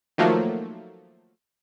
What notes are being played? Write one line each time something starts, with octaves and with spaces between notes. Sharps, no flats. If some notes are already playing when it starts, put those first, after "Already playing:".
D#3 F3 F#3 A3 A#3